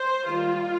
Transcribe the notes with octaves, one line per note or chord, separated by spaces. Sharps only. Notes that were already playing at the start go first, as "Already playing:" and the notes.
Already playing: C5
D#3 G3 A#3 F4